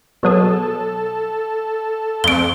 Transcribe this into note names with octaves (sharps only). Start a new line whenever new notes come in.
B2 F#3 G#4 A4
F2 D7 G7